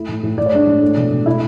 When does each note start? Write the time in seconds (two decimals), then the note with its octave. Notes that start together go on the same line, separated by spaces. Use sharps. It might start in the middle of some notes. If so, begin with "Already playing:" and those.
Already playing: A3 E4
0.09 A2
0.23 A2
0.38 A2 D5
0.46 C#5
0.53 G#3 D4 D5
0.67 A2
0.81 A3
0.97 B2
1.11 B2
1.26 A3 E4 E5